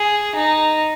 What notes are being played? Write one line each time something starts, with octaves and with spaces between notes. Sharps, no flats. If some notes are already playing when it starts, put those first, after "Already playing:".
Already playing: G#4
D#4